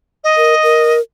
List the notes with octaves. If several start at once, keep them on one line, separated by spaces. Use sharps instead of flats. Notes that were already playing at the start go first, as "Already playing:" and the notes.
D#5
A#4
A#4